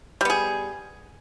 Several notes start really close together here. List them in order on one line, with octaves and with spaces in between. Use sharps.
G3 B3 G#4